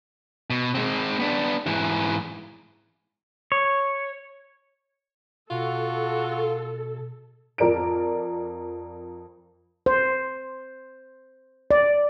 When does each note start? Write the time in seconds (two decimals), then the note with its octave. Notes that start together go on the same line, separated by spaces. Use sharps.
0.50 B2
0.75 G#3 C4
1.20 B3 D4
1.66 G#2 E3
3.52 C#5
5.51 B2 F4 F#4 A4
7.58 F2 A#4 D5 D7
9.86 C5
11.71 D5